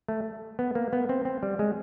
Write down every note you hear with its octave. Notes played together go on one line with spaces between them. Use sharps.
A3
B3
A#3
B3
C4
C4
G3
G#3